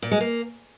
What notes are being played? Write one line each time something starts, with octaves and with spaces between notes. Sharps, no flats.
A#2
G#3
A#3